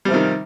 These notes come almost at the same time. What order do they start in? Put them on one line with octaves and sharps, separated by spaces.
G3 F3 C3 D#3